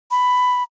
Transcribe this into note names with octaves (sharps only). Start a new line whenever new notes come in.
B5